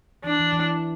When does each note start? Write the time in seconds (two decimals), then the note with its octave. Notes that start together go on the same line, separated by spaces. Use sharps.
0.24 E3 D4
0.39 E3
0.52 E3